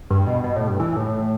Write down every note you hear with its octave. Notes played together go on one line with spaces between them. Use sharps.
G2
B2
B2
A2
G2
E3
A2